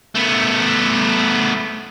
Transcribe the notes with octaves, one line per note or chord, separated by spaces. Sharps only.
A3 B3